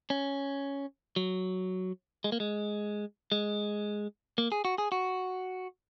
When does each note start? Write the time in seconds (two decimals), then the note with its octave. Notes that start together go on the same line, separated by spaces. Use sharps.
0.10 C#4
1.16 F#3
2.24 G#3
2.32 A#3
2.40 G#3
3.32 G#3
4.38 A#3
4.52 G#4
4.65 F#4
4.78 G#4
4.92 F#4